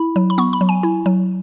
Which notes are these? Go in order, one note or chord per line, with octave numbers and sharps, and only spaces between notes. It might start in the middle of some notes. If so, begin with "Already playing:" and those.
Already playing: E4 B5
F#3
B5
B3 C#6
B5
F#3
G#5
E4
F#3